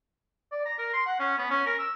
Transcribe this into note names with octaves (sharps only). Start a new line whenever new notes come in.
D5
A#5
A#4
C6
F#5
C#4
B3
C#4
A#4
E6